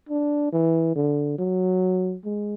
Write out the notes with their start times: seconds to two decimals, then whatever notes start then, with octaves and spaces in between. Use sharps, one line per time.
0.09 D4
0.52 E3
0.96 D3
1.38 F#3
2.25 G#3